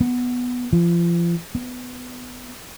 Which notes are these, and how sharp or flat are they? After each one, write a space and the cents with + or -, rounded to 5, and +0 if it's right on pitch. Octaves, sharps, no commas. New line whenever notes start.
B3 +0
F3 -35
B3 +15